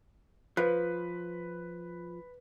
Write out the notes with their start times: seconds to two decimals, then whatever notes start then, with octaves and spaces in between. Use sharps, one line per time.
0.57 F3 B4